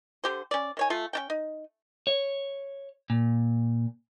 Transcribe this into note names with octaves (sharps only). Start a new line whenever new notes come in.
D3 G4 C5
C#4 D5
D#3 C#5 G#5
A3 F4
C#4 D4 G5
D#4
C#5
A#2